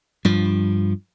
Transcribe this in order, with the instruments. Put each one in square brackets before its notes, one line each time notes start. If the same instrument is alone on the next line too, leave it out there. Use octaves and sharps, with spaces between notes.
[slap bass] G2 F3